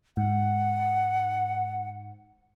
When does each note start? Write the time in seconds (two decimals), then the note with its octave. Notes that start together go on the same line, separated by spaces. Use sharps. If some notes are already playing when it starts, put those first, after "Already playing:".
0.17 G#2 F#5